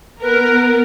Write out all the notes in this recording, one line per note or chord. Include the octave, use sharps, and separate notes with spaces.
B3 A#4 B4